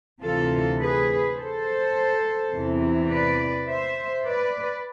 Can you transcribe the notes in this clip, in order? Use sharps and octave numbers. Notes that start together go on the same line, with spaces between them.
D2 C3 E3 F4 A4
G#4 B4
A4 C5
E2 C3 E3
B4 D5
C5 E5
B4 D5